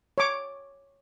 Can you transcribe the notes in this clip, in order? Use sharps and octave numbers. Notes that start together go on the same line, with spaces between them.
C#5 D6